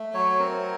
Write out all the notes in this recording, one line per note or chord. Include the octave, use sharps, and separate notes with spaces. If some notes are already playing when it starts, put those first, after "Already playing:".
Already playing: A3
F#3 C#5
C4 A#4